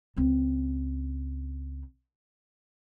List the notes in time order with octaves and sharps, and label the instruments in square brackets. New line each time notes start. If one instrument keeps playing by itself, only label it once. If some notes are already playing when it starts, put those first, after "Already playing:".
[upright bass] C#2 C4